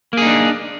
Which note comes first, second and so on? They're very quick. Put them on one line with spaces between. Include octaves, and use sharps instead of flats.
A#3 G#4 D#4 D4